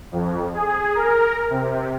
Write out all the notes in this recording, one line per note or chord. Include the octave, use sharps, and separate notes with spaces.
F2
G#4
A#4
C3